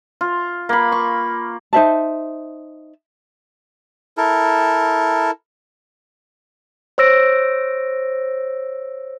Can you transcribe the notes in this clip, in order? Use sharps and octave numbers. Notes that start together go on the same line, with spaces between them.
F4
A#3 B5
C#6
D#4 C5 E5 A5
E4 A4 A#4
C5 C#5 E6 A#6 D7